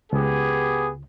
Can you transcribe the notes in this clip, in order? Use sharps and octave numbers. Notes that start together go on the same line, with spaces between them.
C#2 B3 G4 G#4